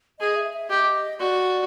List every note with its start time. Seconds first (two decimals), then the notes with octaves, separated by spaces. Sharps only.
0.19 G#4 D#5
0.36 E5
0.53 E5
0.70 G4 D#5
1.20 F#4 D5